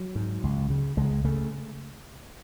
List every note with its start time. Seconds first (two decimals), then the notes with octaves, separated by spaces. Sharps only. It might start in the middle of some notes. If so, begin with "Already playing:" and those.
Already playing: F#3
0.15 G#2
0.43 C#2
0.70 C#3
0.97 C#2 G#3
1.25 C#3 A3